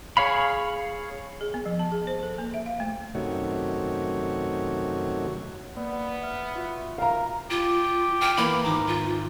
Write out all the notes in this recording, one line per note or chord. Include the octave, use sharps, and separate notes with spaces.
G#4 C#5 F5 B5
G#4
B3
F3
A5
G#4
C5
A4
A#3
E5
F5
A3
F#2 C3 D#3 A3 F#4 C#5
A#3 B3 D5
E5 F6
F4 F#4 E5
A#4 F5 A#5
F4 G4
G5 F6
E3 A#3 B3 B5
G#1 G#2 A#5 D6
F4